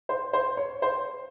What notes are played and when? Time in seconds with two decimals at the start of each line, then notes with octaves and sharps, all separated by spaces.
0.09 C5
0.33 C5
0.57 C#5
0.82 C5